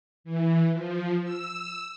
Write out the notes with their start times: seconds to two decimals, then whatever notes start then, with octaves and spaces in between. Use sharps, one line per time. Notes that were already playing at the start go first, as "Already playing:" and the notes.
0.24 E3
0.72 F3
1.23 E6